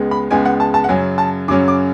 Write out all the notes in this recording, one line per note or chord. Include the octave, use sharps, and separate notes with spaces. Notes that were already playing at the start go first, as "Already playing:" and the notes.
Already playing: C#2 C#3 G#3 B3
B5
C#2 C#3 G#3 B3 G#5
F#5
A5
A5
F#5
F#2 C#3 F#3 C#4 G#5
A5
F#2 C#3 F#3 C#4 D6
D6